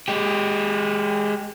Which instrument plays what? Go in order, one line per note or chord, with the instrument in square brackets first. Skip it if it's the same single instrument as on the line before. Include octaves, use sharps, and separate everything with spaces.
[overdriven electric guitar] G#3 G4